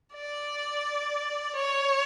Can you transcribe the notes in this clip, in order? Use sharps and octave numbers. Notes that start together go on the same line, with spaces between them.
D5
C#5